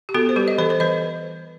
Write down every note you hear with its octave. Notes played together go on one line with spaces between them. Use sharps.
G4
B3 F#4 A4
C5
G3 G4 B4
D#5
E3 A4 C5
C5
E3 B4 D#5